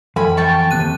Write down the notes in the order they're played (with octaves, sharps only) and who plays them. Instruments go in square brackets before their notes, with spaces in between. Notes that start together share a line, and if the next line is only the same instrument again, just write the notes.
[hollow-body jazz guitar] F2 [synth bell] E3 [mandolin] G#5 B5
[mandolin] G5 A5 C#6
[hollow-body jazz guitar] D#2 C3 [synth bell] F#6 D#7